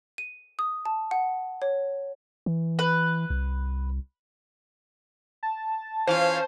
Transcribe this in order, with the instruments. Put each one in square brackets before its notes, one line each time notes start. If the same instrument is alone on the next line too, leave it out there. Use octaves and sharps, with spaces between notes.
[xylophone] D#7
D#6
A5
F#5
C#5
[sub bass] E3
[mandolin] B4
[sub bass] C2
[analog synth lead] A5
[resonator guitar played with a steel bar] E3 F4 [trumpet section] C#4 F5 [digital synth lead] C5